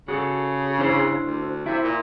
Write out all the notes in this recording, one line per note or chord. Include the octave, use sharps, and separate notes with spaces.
C#3 F#4 G#4 A4
D4 E4 C5
D2
C3 E4 E5
A#2